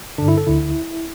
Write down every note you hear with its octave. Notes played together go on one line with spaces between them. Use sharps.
G2 D3 D4
E4
A4
D2 D3 E4